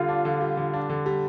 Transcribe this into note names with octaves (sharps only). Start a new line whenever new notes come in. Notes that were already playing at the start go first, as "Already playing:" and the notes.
Already playing: D3 G3 F4
D4
D3
G3
D3
D4
D3
G3